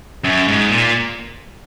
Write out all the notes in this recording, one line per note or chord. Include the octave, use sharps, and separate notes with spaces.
F#2
G#2
A#2